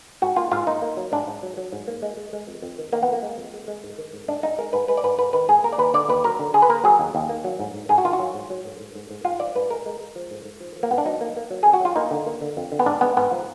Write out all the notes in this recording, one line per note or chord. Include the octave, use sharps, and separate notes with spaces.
G#2 F#4
A#3 F4
G#2 F4
A#3 D#4
A#3
F#3
G#2 D4
G#2
F#3
F#3
G#2
A#3
G#3
G#3
G#3
F2
F2
D#3
D#3 A#3
B3
F2 A#3
G#3
F2
G#3
G#3
G#2
D#3
G#2
G#2 D4
G#2 D#4
G#3 A#4
G#2 B4
G#3 B4
D5
G#2 B4
G#2 B4
D#3 B4
G#2 G#4
A#3 A#4
D5
D#2 B4
D3 D5
D#2 B4
F#3 A#4
D3
D3 G#4
B4
A#3 A#4
F#3 G#4
D#2
D#2
A#3
F#3
G#2
G#2
G#2 G#4
F#4
D#3 F4
F#4
F#3
G#2
F#3
G#2
G#2
G#2
G#2
G#2 F4
F3 D5
G#2 B4
G#3 A#4
G#3
G#3
F3
G#2
G#2
F3
F3
A#3
G#2 B3
D4
F#3 D#4
A#3
A#3
F#3
F2 G#4
F#4
F#3 F4
A#3 D#4
D3
A#3
D3
F2
D3
B3
G#2 D4
G#3 B3
G#2 B3
F3